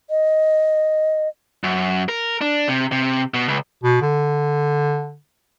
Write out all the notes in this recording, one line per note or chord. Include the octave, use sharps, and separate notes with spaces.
D#5
F#2
A#4
D4
C3
C3
B2
C#2
B2
D3